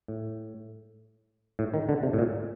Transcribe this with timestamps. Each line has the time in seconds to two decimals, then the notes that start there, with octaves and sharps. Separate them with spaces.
0.08 A2
1.59 A2
1.74 D#3
1.89 D3
2.03 C3
2.13 A2
2.19 A#2